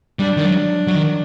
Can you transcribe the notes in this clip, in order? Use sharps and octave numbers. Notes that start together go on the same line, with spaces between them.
G3 D4
D#3
F#3
F#3
D#3